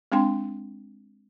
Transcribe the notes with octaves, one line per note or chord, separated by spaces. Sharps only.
G#3 C4 D4 G5 C6